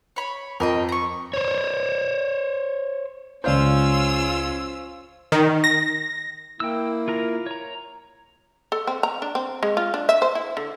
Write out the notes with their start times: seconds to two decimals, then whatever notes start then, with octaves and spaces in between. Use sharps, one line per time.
0.16 C#5 B5
0.60 F2 A#4 D#5 G5
0.89 A#5 C#6
1.34 C5 C#5
3.44 C#2 C#4 F4 C5 D5 F5 E6 G6
5.32 D#3
5.64 A#6
6.60 A#3 E4 G5 E6
7.08 F4 A#4 A#5
7.46 C#5 A#5
8.72 A4
8.87 C4
9.03 A#5
9.22 D4
9.35 C4
9.63 G#3
9.77 F4
9.94 D4
10.09 E5
10.22 C5
10.35 E4
10.57 D3